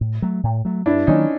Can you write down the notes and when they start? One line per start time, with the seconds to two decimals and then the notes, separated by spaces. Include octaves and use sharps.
0.01 A2
0.22 F#3 A3
0.43 A2
0.65 F#3 A3
0.86 G2 D4 E4
1.07 D#3 F#3 A#3 C#4 D#4